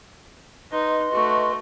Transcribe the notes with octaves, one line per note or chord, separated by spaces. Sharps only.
D#4 B4 D#5 C6
A3 F#4